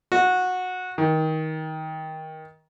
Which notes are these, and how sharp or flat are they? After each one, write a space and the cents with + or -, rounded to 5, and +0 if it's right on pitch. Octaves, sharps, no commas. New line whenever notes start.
F#4 -15
D#3 +20